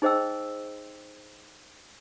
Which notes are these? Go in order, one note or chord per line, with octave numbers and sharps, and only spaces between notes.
D#4 G#4 C5 D#5 G5 E6